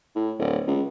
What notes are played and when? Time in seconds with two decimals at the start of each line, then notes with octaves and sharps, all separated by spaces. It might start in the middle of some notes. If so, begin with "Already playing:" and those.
0.15 A2
0.39 D1
0.67 C#2